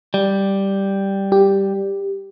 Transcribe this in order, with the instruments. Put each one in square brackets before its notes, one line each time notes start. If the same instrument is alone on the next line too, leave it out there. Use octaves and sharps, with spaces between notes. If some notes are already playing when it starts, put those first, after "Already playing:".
[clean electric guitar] G3
[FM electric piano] G4